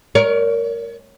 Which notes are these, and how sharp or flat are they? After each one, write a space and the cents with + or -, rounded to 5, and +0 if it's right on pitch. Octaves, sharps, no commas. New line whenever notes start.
A#4 +0 C#5 +40